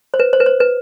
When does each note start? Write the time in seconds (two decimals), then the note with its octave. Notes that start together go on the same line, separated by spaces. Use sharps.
0.14 C5
0.20 B4
0.33 C5
0.40 B4
0.46 C5
0.60 B4